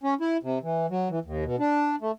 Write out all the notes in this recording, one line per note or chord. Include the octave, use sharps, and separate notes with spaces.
C#4
E4
C3
E3
F#3
E3
D#2
B2
D4
A3